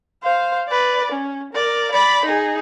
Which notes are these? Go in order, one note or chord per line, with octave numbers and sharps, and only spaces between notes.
C5 F5
B4 D5
C#4
A#4 D5
D5 B5
D#4 G#4